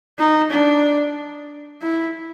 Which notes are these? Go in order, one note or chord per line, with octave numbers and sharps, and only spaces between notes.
D#4
D4
E4